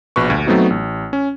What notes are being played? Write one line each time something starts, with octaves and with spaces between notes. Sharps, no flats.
A#1 B2 B4 C#6
D2
F#3 A3 B3 C4 D#4 F#4
A1
C#4